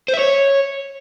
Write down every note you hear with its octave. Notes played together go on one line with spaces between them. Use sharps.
C5
E5
C#5